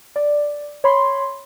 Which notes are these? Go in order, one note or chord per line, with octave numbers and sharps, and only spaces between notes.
D5
C#5 B5 C6